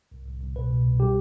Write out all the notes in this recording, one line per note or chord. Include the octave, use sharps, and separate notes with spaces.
C2
C2
C2
B2 B4
B2
C2
G3 G4